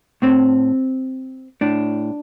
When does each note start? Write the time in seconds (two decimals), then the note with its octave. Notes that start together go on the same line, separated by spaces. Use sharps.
0.22 A2 C4
1.61 A2 D4